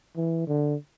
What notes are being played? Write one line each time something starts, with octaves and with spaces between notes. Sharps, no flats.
E3
D3